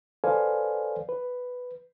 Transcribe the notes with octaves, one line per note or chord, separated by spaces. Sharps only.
A4 B4 C5 D5 F5 G#5
B4